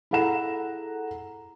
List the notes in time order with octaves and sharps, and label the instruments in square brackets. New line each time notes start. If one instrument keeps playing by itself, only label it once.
[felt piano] E4 G#4 A4 F#5 A#5 E7